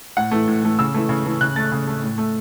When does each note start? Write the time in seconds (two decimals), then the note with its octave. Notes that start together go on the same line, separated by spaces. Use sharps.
0.17 A2 F#5
0.31 E3 A3
0.47 A2
0.63 E3 A3
0.79 C#3 E6
0.94 E3 A3
1.09 C#3
1.25 E3 A3
1.41 C#3 F#6
1.56 A3 A6
1.72 C#3
1.87 A3
2.03 A2
2.18 A3